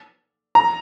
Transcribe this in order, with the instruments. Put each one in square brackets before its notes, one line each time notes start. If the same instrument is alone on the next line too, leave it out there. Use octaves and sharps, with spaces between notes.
[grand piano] A#5